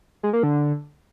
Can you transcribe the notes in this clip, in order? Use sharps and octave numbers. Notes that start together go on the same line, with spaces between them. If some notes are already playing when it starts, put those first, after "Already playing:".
G#3
A#3
D3